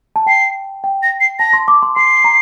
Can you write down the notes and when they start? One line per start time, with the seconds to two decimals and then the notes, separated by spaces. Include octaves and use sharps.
0.16 A5
0.26 G5 C7
0.84 G5
1.03 A#6
1.20 C7
1.39 A5 A#6
1.53 C6
1.68 D6
1.83 C6
1.96 C6 C7
2.24 A#5